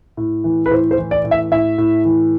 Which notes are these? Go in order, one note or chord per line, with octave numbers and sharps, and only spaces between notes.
A2
E3
B4
A2 C5
C5
E3
D5
A2
E5
A2 E5
A2
E3